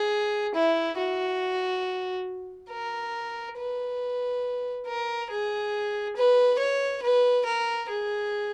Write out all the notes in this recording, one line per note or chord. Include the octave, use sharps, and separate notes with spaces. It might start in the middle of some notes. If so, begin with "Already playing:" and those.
Already playing: G#4
E4
F#4
A#4
B4
A#4
G#4
B4
C#5
B4
A#4
G#4